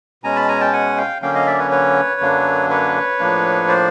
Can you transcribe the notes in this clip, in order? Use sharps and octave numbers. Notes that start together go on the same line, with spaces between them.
B2 G#3 C#4 G#5 A#5
A5 B5
G#5 A#5
G5 A5
F#5 G#5
F5 G5
D3 F#3 A#3 C#4 F5 G5
D#5 F5
D5 E5
B4 C#5
B4 C#5
F#2 D3 F#3 A#3 D4
B4 C#5
A2 F3 A#3 D4
C5 D5